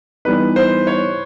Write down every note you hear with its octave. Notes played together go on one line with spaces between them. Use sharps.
E3 G3 B3 D#4 B4
C5
C#5